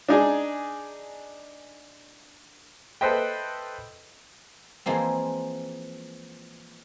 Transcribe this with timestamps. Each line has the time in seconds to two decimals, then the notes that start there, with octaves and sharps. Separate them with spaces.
0.09 D4 D#4 G#4
3.01 A4 B4 C5 D#5 E5 G5
4.86 E3 F3 G#3 A#3 C4